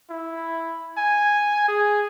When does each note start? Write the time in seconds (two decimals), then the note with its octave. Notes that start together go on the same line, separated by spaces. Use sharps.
0.10 E4
0.98 G#5
1.69 G#4